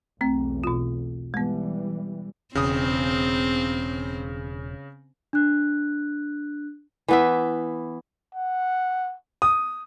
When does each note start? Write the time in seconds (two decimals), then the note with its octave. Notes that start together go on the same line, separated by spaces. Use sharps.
0.21 B1 E2 A3 C4
0.64 B2 F4
1.34 E3 G3 G#3 B3
2.55 E1 C#3 C4 D#6
5.33 D4 F#6
7.08 E3 B3 E5
8.35 F#5
9.42 D#6